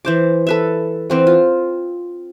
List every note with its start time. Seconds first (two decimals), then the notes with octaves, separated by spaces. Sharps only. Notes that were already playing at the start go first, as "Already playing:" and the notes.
0.05 E3 C5 D6
0.47 A4 B4 E5
1.10 E3 C4 F#5
1.27 F4